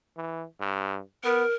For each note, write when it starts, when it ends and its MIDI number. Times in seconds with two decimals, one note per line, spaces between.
0.17 0.45 52
0.61 1.01 43
1.24 1.44 59
1.24 1.55 70